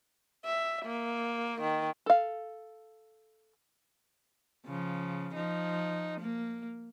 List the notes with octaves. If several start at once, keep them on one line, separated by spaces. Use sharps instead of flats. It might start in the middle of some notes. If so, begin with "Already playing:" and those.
E5
A#3
D#3
A4 F5
C#3 F3
F3 D#4
A#3